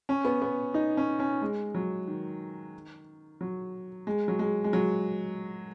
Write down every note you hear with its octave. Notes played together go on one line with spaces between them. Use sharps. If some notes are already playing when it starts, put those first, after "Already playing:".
C#4
B3
B3
D#4
C#4
C#4
G#3
F#3
D#3
F#3
G#3
F#3
G#3
G#3
F#3